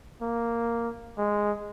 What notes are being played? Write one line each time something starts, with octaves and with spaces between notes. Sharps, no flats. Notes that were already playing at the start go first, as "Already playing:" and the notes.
A#3
G#3